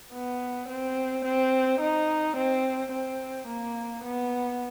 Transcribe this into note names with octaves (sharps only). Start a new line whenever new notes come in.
B3
C4
C4
D#4
C4
C4
A#3
B3